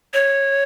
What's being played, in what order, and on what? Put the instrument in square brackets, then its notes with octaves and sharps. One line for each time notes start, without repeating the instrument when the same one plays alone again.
[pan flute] C#5